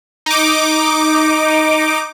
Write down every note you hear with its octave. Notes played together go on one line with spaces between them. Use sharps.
D#4 D6